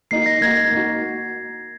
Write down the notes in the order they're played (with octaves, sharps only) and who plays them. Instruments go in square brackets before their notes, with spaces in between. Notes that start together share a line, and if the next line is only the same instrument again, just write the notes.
[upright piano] A#3 D#4 F#4 [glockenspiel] C7
[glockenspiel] A#6
[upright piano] A#3 D#4 F#4 [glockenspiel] G#6
[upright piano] A#3 D#4 F#4